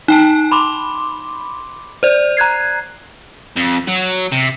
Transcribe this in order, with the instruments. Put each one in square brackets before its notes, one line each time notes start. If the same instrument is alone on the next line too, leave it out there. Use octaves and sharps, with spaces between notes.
[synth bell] D#4 G5 A5
B5 C6 D6
C5 D5
A#5 F#6 G#6 C7
[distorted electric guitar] F2
F#3
C3